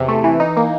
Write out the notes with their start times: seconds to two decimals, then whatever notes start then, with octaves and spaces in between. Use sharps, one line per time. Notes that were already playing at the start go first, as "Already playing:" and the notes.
Already playing: E2 C3 E3
0.08 A3
0.24 E3
0.40 D#4
0.57 A#3